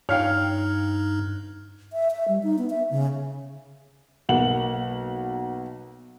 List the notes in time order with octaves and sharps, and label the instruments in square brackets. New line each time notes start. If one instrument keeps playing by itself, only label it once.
[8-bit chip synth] G2 D#4 [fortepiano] C#5 F5 G5 [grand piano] F6
[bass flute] E5
E5
G3
D#4
B3
E5
C#3
[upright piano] B1 A#3 F#5 F#7